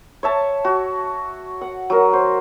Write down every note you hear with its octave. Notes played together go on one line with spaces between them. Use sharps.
C#5 E5 A5
F#4
F#5
F#3 A#4
C5